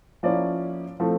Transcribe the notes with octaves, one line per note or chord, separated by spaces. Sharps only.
F3 A#3 C#4 E4 D5
F3 A3 C4 E4